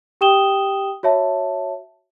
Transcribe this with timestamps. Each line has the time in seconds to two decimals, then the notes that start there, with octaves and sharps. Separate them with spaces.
0.21 G4 G5 D#6 E7 G7
1.03 F#4 C#5 E5 A5